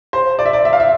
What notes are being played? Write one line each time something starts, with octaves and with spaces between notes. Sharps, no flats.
C5
D5
E5
D5
E5
F5
E5